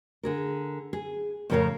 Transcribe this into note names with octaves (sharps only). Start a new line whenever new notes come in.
D3 G#4 A#4
G#4
F2 A2 C#3 A#4 C#5 F5